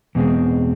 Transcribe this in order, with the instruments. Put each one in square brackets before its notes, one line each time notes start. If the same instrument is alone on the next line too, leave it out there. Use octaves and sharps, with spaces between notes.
[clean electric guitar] E2 B2 G#3 C4